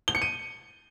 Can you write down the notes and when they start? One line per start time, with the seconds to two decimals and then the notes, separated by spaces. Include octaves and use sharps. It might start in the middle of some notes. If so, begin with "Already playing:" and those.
0.08 G7
0.15 C#7
0.22 D#7